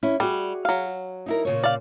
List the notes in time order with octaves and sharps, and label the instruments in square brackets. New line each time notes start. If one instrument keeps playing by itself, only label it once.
[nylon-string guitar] C#4 E4
[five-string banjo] G3 [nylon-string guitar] F#4 G#4
[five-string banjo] F#3 F5
[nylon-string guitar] D#4 E4 A#4
A#2 C#3 C#5
[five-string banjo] D5 F5